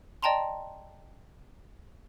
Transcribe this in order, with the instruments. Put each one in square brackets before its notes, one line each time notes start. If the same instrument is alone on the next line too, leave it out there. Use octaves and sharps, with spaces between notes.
[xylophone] D5 D#5 G5 A5 A#5 C6